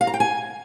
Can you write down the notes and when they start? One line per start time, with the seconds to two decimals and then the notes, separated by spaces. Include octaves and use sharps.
0.01 F5
0.07 A#5
0.14 G5
0.20 G#5